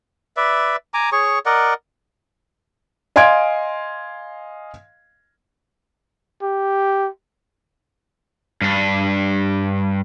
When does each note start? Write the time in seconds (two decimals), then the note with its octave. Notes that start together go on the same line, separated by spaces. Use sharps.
0.37 B4 D5 E5
0.94 G#5 A#5 D6
1.12 G#4 C#5 C#6
1.46 A#4 D5 D#5 F#5
3.16 D#5 F5 G#5 C6 G#6 D7
6.42 G4
8.62 G2 D4